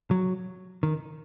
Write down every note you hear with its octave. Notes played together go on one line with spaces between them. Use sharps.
F#3
D#3